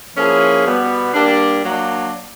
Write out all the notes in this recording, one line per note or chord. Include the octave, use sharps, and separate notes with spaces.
F3 A#3 C#4 E4 G#4
B2 G3 B3
G3 A#3 D4
F#3 A#3 D4